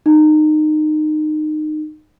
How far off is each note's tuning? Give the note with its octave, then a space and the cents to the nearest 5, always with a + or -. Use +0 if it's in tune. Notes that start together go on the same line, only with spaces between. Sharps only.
D#4 -25